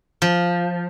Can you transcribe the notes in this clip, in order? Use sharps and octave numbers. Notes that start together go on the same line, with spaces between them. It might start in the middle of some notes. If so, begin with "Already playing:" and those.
F3